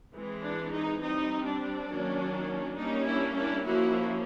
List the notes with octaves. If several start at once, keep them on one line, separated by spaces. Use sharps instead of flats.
E3 G#3 C4
D4
D#4
G3 C4 D#4
D4
D#3 F#3 A#3 C#4
G3 A#3 C#4 D#4
D4 E4
D4 E4
F3 A#3 C#4 E4 F#4